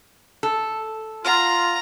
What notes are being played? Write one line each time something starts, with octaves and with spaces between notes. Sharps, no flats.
A4
F4 F#5 A#5 C6 F6